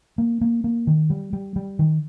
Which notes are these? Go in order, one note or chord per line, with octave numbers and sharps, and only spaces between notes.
A#3
A#3
A#3
D#3
G3
G3
G3
D#3